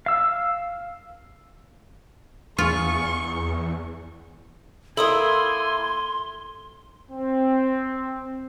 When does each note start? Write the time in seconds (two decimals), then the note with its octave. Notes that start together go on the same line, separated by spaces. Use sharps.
0.06 F5 E6
2.58 E2 F4 G#4 C#6
4.97 A#3 E4 A4 G#5 C6 D#6
7.10 C4